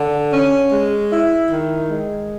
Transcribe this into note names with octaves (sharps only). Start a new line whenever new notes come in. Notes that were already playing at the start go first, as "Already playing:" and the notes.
Already playing: D3
C#4
G#3
E4
D#3
G#3